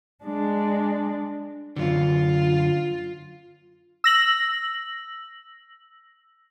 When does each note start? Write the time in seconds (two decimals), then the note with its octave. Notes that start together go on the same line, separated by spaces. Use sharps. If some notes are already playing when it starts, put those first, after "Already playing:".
0.25 G#3 D4
1.76 F#2 D3 F4
4.04 E6 A#6 F#7